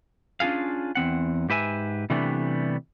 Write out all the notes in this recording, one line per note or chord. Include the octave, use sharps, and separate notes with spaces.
C#4 D4 F4 G#4 F5
E2 C4 F#5
G#2 G4 B4 E5 G#5
C3 E3 G3 A3 B3 D4